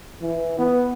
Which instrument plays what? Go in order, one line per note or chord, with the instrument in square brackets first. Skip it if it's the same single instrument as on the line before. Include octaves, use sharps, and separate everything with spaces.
[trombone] E3
B3